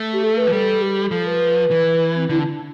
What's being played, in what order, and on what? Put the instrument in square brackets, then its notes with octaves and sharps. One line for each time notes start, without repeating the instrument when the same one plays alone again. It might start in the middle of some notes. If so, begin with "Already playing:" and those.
Already playing: [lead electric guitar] A3
[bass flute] G4
A4
B4
[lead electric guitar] F3
[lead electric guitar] G3 [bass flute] A4
[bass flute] G4
[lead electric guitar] F3 [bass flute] A4
[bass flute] B4
[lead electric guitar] E3
[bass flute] C4
[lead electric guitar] D3 [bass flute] E4
[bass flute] D4
D4